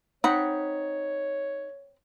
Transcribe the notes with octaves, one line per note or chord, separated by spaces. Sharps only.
C4 D#4 C#5 F#5 B5